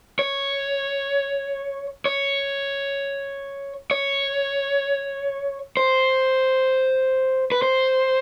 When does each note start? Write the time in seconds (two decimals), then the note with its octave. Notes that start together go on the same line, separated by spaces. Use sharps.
0.19 C#5
2.05 C#5
3.91 C#5
5.77 C5
7.52 B4
7.62 C5